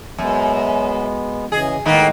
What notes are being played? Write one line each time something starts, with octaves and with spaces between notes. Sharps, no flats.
F#2 G#3 B3
C#3 E3 G#4 D#5
A2 D#3 G#3 A#3 B3